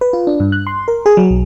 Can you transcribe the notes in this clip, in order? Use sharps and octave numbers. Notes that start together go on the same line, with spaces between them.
B4
F4
D4
G2
F#6
C6
A#4
G#4
F#3
B1